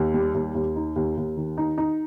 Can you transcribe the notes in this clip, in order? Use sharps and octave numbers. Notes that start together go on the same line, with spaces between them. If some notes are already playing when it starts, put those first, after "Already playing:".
Already playing: D#2
G3
D#2
D#2
D#4
D#2
D#2
D#3
D#4
D#4